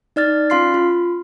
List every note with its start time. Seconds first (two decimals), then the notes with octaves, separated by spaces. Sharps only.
0.16 D#4 D5 F6 A6
0.50 C#4 F4 F5 C6 F6 C7
0.74 F4